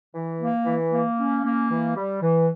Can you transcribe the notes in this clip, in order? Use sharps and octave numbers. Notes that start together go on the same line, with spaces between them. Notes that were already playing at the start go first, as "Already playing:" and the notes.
E3
A#3
E3
A#3
C#4
A#3
E3
G3
E3